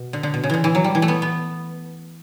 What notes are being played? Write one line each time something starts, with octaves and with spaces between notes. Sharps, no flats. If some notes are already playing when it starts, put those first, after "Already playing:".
Already playing: B2
D3
D3
B2
C#3
D3 E3
E3
F#3
G3
E3
A3
B3
B3